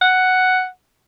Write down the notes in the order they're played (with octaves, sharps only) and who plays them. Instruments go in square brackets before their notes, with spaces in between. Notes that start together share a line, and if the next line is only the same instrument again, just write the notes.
[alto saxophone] F#5